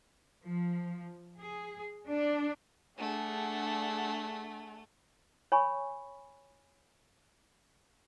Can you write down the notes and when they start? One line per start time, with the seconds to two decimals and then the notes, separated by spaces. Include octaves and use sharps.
0.44 F3
1.39 G#4
2.07 D4
2.98 A3 D4 G#4 F#5
5.52 C#5 G#5 B5 C#6